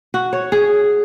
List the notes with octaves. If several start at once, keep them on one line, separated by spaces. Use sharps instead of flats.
F#4
C#5
G#4